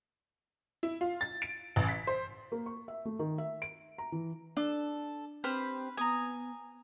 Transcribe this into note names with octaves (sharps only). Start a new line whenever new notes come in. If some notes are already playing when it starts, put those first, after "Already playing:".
E4
F4
A6
D7
A1
B6
C5
A#3
C#6
E5
A3
D#3
E5
D7
A#5
E3
D4 A4
C4 G4 B4 C5 F6
B3 G#5 A#5 D#6